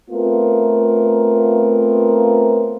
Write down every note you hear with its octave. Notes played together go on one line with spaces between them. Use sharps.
A3 B3 C4 F4 A#4